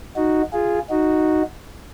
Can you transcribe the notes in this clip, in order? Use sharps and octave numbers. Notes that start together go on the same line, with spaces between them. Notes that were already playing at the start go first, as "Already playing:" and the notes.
D#4 F#4
F4 G#4
D#4 F#4